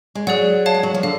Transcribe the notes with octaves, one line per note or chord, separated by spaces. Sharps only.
G#3
F#3 G#4 D5 F#5
C#5 F5 A5
G#3
F#3
F3
D3 F5